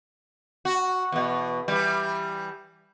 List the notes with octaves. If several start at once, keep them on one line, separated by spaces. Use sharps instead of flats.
F#4
E2 B2
E3 G3